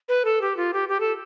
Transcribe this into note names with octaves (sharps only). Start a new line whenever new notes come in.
B4
A4
G4
F4
G4
G4
A4